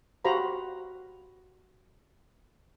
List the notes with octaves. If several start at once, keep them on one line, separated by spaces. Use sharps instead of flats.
F#4 G4 C5 F5 A#5 B5